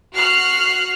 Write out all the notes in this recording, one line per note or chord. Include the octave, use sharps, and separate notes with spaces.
F#4 F6 F#6 C7